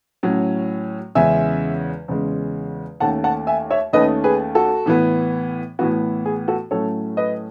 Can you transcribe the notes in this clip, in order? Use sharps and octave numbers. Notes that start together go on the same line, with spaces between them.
A2 F#3 C#4
E2 C#3 G#3 C#4 E5 G#5
E2 C#3 G#3 C#4
D#2 D#3 A3 C#4 F#5 A5
F#5 A5
E5 G#5
C#5 E5
D#2 D#3 A3 C#4 B4 D#5
G#4 B4
F#4 A4
A2 E3 B3
A2 E3 B3 F#4
G#4
F#4 A4
A2 F#3 A3 C#4 A4 C#5
B4 D#5